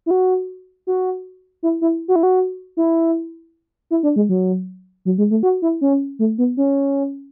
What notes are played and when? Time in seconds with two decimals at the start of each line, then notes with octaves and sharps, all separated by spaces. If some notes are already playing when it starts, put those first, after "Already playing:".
0.06 E4
0.11 F#4
0.87 F#4
1.63 E4
1.81 E4
2.08 F#4
2.16 E4
2.23 F#4
2.77 E4
3.91 E4
4.03 D4
4.16 G#3
4.29 F#3
5.05 F#3
5.18 G#3
5.31 A3
5.43 F#4
5.62 E4
5.81 C#4
6.19 A3
6.38 B3
6.57 C#4